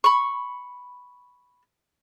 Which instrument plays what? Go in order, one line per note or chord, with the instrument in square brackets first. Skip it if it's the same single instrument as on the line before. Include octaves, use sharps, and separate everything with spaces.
[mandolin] B5 C#6